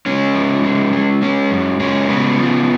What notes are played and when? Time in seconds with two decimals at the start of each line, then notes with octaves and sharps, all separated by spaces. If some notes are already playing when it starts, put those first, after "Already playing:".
0.06 G#3 C#4
0.34 F3
0.64 G#3
0.93 G#3
1.22 G#3 C#4
1.51 F#2
1.80 G#3 C#4
2.09 C#3 B3
2.37 F3